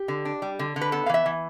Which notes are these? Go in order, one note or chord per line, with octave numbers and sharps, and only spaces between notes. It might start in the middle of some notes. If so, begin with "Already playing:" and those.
Already playing: G4
D3
D4
G3
D3
D3
B4
B3 A4
F5
E3 E5
E3